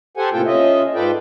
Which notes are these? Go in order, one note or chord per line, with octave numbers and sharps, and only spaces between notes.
G4 A4 C5 F#5 G#5
A2 C3 A#3 F4 A4 G5
C#4 F4 D#5 E5
G#2 F4 A4 B4 D5 G5